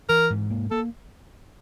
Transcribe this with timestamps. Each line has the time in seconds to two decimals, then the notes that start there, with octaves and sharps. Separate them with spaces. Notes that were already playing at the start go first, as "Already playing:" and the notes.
0.09 E3 A#4
0.30 G#2
0.50 A#3
0.71 A#3 A4